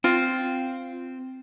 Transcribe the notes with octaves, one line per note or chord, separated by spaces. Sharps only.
C4 F4